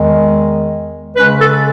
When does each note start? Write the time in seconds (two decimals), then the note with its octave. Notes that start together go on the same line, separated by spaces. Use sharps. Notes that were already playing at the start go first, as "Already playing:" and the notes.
Already playing: E2 D#3 G#3
1.16 C#3 G#3 C#4 B4
1.39 A4